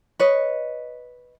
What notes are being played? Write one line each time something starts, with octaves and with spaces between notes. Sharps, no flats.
B4 C#5 D#5